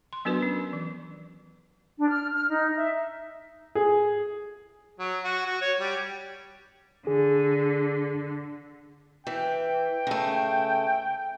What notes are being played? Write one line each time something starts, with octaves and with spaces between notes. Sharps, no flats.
C6
F#3 B3 D4 F#4 A#4 B4
C#4
E3
D4
F6
F6
D#4
E5
G#4
F#3
F#4
F#4
C#5
G3
D3 G#4
E3 G5
C#3 A3